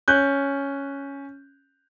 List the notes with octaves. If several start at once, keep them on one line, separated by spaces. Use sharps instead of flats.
C#4 F#6 G6